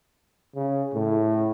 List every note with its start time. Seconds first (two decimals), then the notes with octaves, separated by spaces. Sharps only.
0.55 C#3
0.94 A2